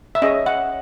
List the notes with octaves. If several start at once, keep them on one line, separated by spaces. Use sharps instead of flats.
E5
C#4 G#4 C#5 D#5
F#5